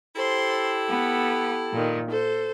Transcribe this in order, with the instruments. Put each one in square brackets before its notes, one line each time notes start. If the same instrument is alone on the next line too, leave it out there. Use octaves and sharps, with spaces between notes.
[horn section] E4 G4 A4 [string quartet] C5 C6
[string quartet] B3
A#2 D#3
A4 C5